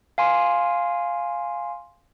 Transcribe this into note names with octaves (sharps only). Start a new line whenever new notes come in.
F5 G#5 C6